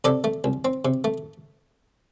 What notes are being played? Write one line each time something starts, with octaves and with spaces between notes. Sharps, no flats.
C3 A4 D5
A3
C2
C4
C3
A3